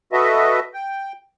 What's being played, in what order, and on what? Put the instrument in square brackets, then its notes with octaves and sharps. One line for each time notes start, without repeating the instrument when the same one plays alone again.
[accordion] F#4 A4 B4 D#5 E5
G5